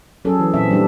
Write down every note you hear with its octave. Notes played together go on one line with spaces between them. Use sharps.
F#3 C#4 G#4 A4
E3
A#2 C4 E5
G3 D4